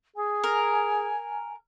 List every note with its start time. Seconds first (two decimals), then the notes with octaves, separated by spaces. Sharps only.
0.16 G#4 G#5
0.44 A#4